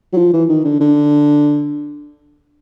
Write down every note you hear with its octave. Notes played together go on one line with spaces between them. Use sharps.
F#3
F3
E3
D#3
D3
D3